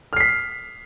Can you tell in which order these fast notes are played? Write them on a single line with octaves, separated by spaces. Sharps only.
F6 C7 B6